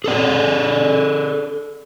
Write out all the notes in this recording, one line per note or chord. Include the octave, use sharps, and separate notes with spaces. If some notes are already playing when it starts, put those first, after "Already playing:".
G#4 A4 D5